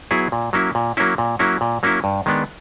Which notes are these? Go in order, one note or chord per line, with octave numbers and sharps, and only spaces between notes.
F#3 B3 E4 G#4
A#2
F#3 A#3 C#4 E4
A#2
F#3 A#3 C#4 E4
A#2
F#3 A#3 C#4 E4
A#2
F#3 A#3 C#4 E4
G2
D#3 G#3 B3 D4